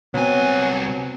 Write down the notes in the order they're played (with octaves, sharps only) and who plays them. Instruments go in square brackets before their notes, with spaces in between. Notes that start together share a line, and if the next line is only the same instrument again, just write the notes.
[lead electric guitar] C2 G#5 [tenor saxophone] F#3 [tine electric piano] B3 C4